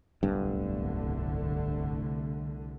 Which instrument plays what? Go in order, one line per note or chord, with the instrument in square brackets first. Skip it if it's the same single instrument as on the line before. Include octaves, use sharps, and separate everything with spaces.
[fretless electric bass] D1 G1 G2 [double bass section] C2 D3 A3